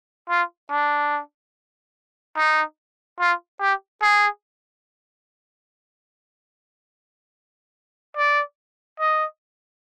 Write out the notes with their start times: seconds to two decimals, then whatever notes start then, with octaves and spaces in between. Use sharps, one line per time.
0.30 F4
0.71 D4
2.37 D#4
3.20 F4
3.61 G4
4.02 G#4
8.17 D5
9.00 D#5